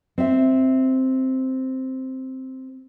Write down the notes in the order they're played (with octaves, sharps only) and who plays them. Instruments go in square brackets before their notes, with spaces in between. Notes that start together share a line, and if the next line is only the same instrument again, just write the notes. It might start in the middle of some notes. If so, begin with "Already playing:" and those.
[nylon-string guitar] C4 E5